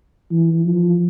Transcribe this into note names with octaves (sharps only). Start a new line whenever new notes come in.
E3
F3